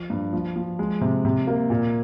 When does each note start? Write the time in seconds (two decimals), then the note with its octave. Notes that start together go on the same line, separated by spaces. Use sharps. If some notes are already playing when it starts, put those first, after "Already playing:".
Already playing: F3
0.10 G2
0.33 F3
0.56 F3
0.79 G#3
1.01 C3
1.25 C3
1.47 A#3
1.70 A#2